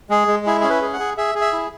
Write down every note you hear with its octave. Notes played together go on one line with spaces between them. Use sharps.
G#3 G#4
G#3
E4 G#4
C#4 G#4
B4
G#4
F#5
G#4
G#4 E5
G#4
E5
E4